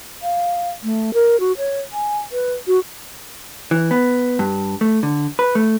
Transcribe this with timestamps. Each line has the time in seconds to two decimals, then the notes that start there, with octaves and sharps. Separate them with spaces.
0.23 F5
0.84 A3
1.14 A#4
1.40 F#4
1.58 C#5
1.93 G#5
2.32 B4
2.67 F#4
3.71 E3
3.91 B3
4.39 G2
4.81 A3
5.03 D3
5.39 B4
5.55 A3